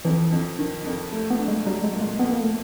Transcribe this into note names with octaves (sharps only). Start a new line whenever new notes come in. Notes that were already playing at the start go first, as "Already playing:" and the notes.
F2 E3
F2
D#3
F2
A3
B3
D4
G#3
F#3 G3
G#3
A#2
G#3
F2 B3
A#3
A3